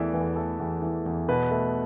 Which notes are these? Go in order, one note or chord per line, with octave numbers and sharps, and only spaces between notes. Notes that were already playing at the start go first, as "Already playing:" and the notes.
Already playing: E2 E3 A3 B4 D5 E5
E2 B4
A4
A3 A4
E2
E3
E2
B2 B4
A3